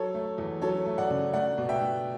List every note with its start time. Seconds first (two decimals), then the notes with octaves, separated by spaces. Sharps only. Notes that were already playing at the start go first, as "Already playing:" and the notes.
Already playing: F#3 A4 C#5
0.14 A3
0.38 E2
0.62 F#3 A4 C#5
0.86 A3
0.98 D5 F#5
1.10 C#3
1.33 A3 D5 F#5
1.58 B2
1.69 E5 G5
1.81 A3